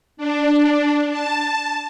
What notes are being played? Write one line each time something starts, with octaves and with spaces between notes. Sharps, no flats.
D4
A5